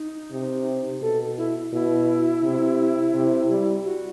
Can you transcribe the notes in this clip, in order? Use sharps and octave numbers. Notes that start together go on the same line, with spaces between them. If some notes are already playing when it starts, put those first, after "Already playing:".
Already playing: D#4
C3
B2 A4
E4
B2 E4
C3
C3
G3
F#4